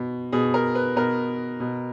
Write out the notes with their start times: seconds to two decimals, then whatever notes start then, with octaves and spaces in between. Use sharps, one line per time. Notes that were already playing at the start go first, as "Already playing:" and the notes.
Already playing: B2
0.32 B2 G#4
0.54 A#4
0.75 B4
0.96 B2 A#4
1.60 B2